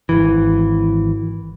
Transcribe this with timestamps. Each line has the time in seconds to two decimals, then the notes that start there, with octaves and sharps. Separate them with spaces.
0.09 G#1 E3